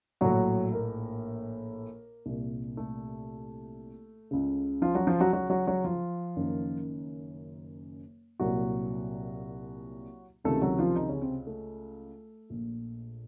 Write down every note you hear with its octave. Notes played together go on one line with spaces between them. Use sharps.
A#1 A2 F#3 F#4
A#3 A#4
C2 A#2
A3 A4
C#2 C#3
F3 F4
F#3 F#4
F3 F4
F#3 F#4
F#3 F#4
F#3 F#4
F#3 F#4
F3 F4
F#1 F#2 D#3
C2 A#2 F#3 F#4
C#2 C3 D#3 A3 A4
F#3 F#4
F3 F4
D#3 D#4
C#3 C#4
C3 C4
A3
A#1 A#2